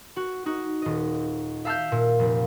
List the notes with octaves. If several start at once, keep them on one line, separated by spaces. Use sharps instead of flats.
F#4
D#4 F#4
D#1 D#5
E5 F5 A5 E6 F6 G6
A#2
F1